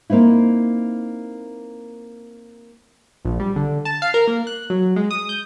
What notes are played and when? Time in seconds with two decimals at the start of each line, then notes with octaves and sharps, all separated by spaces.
0.10 A#3 C4 D#4 E4
3.25 A#1
3.40 G3
3.56 D3
3.85 A5
4.02 F5
4.14 A#4
4.27 A#3
4.47 F#6
4.70 F#3
4.96 G#3
5.11 D#6
5.29 G6